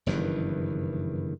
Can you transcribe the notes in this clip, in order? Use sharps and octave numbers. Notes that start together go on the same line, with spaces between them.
F#1 G2 D#3 E3